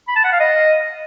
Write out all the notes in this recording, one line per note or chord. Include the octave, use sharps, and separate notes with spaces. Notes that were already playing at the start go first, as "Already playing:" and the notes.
B5
A5
F#5
F5
D#5